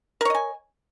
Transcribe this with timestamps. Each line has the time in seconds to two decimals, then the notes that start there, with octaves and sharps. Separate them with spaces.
0.21 A#4
0.25 C#5
0.30 D#5
0.35 G#5